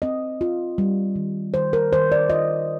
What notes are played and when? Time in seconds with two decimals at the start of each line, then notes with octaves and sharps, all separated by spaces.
0.02 C4 D#5
0.41 F4
0.78 G3
1.16 D#3
1.54 D#3 C5
1.73 A#4
1.93 D#3 C5
2.12 D5
2.29 F4 D#5